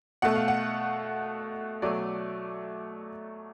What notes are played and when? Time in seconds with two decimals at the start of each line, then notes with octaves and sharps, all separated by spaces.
0.22 B2 A3 F#5
0.36 F5
0.48 F#5
1.82 B2 F#3 A3 D5